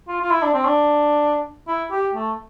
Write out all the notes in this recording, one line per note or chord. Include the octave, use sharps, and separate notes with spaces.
F4
F4
E4
D4
C4
D4
E4
G4
A3